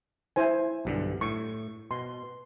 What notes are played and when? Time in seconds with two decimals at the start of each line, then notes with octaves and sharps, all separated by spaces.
0.36 E4 C5 G#5
0.85 B1 G2 D3
1.21 A2 C#6
1.91 B2 C6